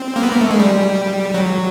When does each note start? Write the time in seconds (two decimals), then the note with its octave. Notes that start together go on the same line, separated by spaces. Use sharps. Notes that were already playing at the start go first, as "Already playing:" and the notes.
Already playing: C4
0.16 A#3
0.23 B3
0.32 A#3
0.41 A3
0.51 G#3
0.59 G3
1.34 F#3